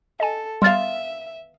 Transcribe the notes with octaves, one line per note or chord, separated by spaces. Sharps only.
A4 D#5 G#5
G3 B3 E5 F5 C6 F6 A6